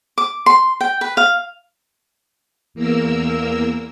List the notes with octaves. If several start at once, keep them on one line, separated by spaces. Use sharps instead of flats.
D6
C6
G5
B4
F5
E2 A#3 A#4 E6